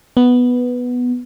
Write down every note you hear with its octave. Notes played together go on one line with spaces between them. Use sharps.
B3